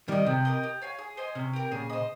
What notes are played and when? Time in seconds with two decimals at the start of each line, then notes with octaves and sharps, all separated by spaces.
0.08 D#3 G3 A#4 D#5
0.26 C3 C4
0.45 G4 A#4 D#5
0.63 G4
0.82 C#5 F5 G#5
0.98 G#4
1.17 C5 D#5 G#5
1.35 C3 C#4
1.53 G4 A#4
1.71 A#2 C#3 G#4
1.90 C5 D#5